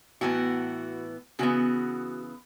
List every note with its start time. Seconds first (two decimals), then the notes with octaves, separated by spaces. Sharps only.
0.21 A2 E3 B3 F#4
1.39 C#3 E3 B3 F#4